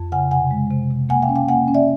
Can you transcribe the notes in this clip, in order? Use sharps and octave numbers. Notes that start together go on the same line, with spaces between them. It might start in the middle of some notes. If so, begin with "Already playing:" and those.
Already playing: F2
C#3 F#5 G#5
C3 F#5 G#5
G#3
C3
C3
A#3 F#5 G#5
F5 G5
C#4
F5 G5
A#3 F#5 G#5
C#4
D5 E5